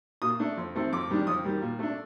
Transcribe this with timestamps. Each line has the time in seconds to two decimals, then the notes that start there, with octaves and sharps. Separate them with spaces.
0.22 A#2 D#6
0.40 A3 D4
0.57 F2
0.75 D#3 A3 C4
0.93 F2 D6
1.10 D#3 G3 D4
1.27 F2 D#6
1.44 D#3 G3 A#3
1.62 A#2
1.79 A3 D4